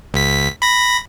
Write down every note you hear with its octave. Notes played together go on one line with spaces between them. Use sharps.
C#2 B6
B5 A#6